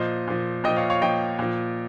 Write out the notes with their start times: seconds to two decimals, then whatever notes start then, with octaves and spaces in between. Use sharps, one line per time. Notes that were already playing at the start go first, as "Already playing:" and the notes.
Already playing: A#2 F3 C5 D#5
0.28 A#2 F3
0.64 A#2 F3 D#5 G5
0.76 C#5 F5
0.90 C#5 F5
1.02 A#2 F3 D#5 G5
1.39 A#2 F3